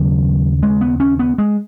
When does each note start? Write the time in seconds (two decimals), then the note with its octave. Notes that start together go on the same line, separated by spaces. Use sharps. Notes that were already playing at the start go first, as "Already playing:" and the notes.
Already playing: D#2 C#3 F#3
0.63 G#3
0.81 B3
1.00 C#4
1.19 B3
1.38 G#3